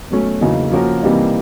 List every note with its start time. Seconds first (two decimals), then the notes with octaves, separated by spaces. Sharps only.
0.10 B2 F#3 A3 C#4
0.41 E2 C#3 F#3 A#3 D#4
0.72 F3 A#3 C#4 F#4 A#4
1.02 C3 E3 G3 A#3 D#4